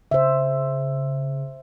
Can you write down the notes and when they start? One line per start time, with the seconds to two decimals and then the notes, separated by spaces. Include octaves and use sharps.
0.11 C#3 C5 E5